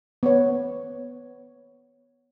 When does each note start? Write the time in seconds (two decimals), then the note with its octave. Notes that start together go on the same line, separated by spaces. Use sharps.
0.23 B3 C#5